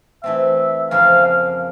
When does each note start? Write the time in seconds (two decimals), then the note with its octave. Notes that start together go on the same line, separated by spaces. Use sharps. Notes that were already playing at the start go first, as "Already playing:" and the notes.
0.23 E3 A3 C4 E5
0.91 F2 C#3 F3 A#3 C#4 F5
1.25 F5